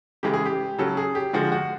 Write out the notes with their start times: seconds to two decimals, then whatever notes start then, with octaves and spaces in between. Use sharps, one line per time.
0.23 C#3 E3 G#3 G4
0.34 G#4
0.45 G4
0.78 C#3 F#3 A4
0.97 G#4
1.15 G4
1.33 D3 F3 G#3 F#4
1.52 F#4